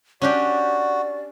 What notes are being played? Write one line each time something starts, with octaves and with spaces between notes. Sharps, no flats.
C#4 D4 F#4 G4 D5